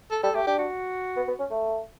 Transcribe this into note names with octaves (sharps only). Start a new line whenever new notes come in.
A4
G3 A4
A3 G4
D4 G4
F#4
B3
B3
C#4
A3